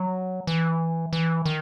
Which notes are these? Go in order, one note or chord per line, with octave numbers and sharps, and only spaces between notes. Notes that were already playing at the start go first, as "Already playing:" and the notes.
Already playing: F#3
E3
E3
D#3